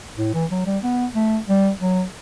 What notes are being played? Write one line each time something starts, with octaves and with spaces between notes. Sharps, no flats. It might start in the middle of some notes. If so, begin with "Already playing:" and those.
A2
E3
F#3
G3
B3
A3
G3
F#3